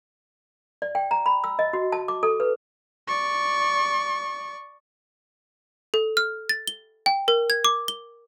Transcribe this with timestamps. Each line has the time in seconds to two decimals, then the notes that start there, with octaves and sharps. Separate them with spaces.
0.82 D5
0.95 G5
1.11 A#5
1.26 B5
1.44 E6
1.59 D#5
1.73 F#4
1.92 A5
2.08 D6
2.23 A4
2.40 B4
3.08 D5 C#6
5.94 A4
6.17 F6
6.49 A6
6.67 G7
7.06 G5
7.28 A#4
7.50 G#6
7.65 D6
7.88 G7